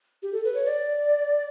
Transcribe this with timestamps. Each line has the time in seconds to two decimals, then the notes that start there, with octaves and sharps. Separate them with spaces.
0.23 G4
0.33 A4
0.44 B4
0.54 C#5
0.66 D5